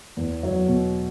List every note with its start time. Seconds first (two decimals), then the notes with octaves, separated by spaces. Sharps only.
0.17 E2
0.43 F#3
0.68 B2